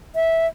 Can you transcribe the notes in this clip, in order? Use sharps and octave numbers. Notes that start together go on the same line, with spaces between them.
E5